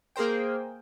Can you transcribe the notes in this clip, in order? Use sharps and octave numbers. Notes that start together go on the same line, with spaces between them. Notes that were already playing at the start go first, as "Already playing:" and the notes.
A#3 G#4 A#4 C5 G5